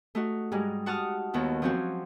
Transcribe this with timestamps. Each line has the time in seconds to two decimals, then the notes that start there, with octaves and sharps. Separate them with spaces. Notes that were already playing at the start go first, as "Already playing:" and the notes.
0.15 A3 D#4 F#4
0.52 G#2 G3 G#3 D#4
0.86 F#4 F#5 A5 D#6 F6
1.33 D#2 D#3 B3 E4
1.62 F3 F#3 C4 C#4 F#4